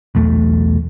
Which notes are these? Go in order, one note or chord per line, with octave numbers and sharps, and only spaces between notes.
B1 E2 A3